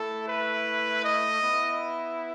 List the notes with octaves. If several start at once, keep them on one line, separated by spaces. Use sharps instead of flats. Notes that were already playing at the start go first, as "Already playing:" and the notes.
Already playing: A3 E4 A4
B4
D#5
B3 E4